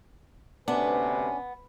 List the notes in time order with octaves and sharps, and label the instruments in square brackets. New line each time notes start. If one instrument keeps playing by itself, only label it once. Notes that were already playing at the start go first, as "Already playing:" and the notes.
[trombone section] D2 C3 B4 [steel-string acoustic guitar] B3 [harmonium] C#4 [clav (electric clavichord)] D4